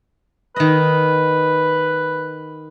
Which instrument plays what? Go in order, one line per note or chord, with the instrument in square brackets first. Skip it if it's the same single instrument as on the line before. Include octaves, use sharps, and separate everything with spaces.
[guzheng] D#3 D#5 [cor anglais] B4